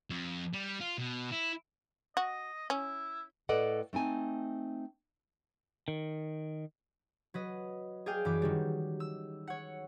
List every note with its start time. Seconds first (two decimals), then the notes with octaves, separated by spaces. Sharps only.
0.10 F2
0.53 G3
0.80 F4
0.98 B2
1.31 E4
2.17 F#4 D#5
2.70 C#4 E4
3.49 A2 A4 B4 D5 D#5 F#5
3.93 A3 C4 D#4 G#5 A5
5.88 D#3
7.34 F#3 B4 D#5
8.06 G#4 D5 F5 G5 G#5
8.25 F#2 E3 E4 D6
8.42 D#3 F#3 G3
9.00 E6
9.47 C#5 F#5